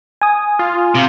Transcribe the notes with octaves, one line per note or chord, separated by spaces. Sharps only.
G#5 D#6
F4
C3